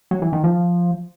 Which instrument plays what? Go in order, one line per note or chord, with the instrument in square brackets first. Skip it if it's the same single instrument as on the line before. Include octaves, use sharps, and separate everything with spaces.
[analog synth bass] F#3
E3
D#3
F3